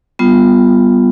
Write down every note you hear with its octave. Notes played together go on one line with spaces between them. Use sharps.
G3 B3 F4